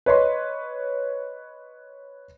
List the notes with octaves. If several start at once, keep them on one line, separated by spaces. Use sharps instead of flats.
B4 C#5 D#5 C6